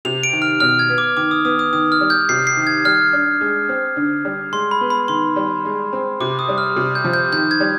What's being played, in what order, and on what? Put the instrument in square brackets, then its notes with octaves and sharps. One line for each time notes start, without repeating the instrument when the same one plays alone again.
[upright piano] C3 [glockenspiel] F7
[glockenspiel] D7
[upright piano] D#3
[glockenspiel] F6
[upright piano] B2 [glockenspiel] F6
[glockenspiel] G#6
[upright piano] B3
[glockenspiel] D6
[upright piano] D#3 [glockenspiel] D6
[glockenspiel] D#6
[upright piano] B3 [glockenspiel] D#6
[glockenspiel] D#6
[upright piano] D#3 [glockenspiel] D#6
[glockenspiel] F6
[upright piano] G3
[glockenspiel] G6
[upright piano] C3 [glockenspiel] C7
[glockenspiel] C7
[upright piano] D#3
[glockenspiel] G#6
[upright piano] G3 [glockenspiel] F6
[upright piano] D4
G#3
C4
D3
G3
[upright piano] G#3 [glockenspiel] C6
[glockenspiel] B5
[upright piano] B3
[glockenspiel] B5
[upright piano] D#3 [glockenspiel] C6
[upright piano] G3
G#3
C4
[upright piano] C3 [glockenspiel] D6
[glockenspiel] D#6
[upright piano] G3
[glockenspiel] F6
[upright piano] C3
[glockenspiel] G6
[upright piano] F3
[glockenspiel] G6
[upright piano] D#3 [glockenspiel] G6
[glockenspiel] G#6
[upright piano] G3